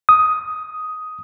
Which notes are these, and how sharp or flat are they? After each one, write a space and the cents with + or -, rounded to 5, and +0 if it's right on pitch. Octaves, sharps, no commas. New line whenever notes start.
D#6 +5